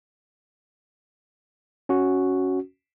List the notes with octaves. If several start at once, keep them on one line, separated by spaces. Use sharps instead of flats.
C#4 F#4